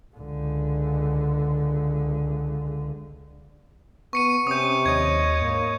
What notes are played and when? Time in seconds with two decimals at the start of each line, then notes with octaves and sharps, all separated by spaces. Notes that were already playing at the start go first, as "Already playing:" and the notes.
0.16 C#2 D3
4.13 B3 C#6 C#7 D#7
4.47 C3 C#4 D#6 G6
4.86 D#2 C#5 D#5 G#6
5.42 G#2 A#3